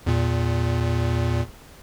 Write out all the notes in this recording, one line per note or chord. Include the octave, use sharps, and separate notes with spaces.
E2 A#2